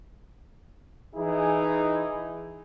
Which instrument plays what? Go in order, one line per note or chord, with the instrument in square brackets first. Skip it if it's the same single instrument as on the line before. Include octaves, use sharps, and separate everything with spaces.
[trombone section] E3 D#4 E4 G#4